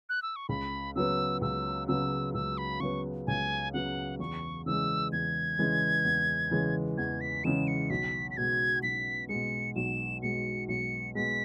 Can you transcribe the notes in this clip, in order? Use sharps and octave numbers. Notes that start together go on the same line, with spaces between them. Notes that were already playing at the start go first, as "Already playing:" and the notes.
F#6
E6
C#6
C#2 B5
C#3 F#3 B3 E6
C#2 E6
C#3 F#3 B3 E6
C#2 E6
B5
C#3 F#3 B3 C#6
C#2 G#5
C#3 F#3 B3 F#5
E2 C#6
C#3 E3 G#3 E6
E2 G#6
C#3 E3 G#3
E2
C#3 E3 G#3
E2 G#6
B6
C#3 E3 G#3 E7
C#7
B1 B6
B6
B2 G#3 G#6
B1 B6
B2 G#3 C#7
B1 E7
B2 G#3 C#7
B1 C#7
B2 G#3 B6